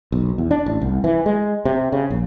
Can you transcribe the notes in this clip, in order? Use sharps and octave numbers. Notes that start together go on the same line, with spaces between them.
B1
E2
D4
A1
C2
E3
G#3
C3
C#3
A#1